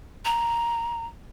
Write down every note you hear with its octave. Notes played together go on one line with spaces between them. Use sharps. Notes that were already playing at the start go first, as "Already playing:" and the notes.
A#5